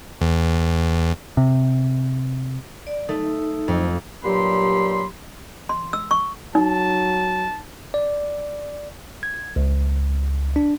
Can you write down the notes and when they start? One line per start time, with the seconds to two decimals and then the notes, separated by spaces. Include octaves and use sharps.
0.21 E2
1.37 C3
2.87 D5
3.09 A3 D#4
3.68 F2
4.24 G2 A#2 F#3 G4 B5 C6
5.69 C6
5.93 E6
6.11 C#6
6.55 F#3 D#4 A5
7.94 D5
9.23 G#6
9.56 C#2
10.56 D4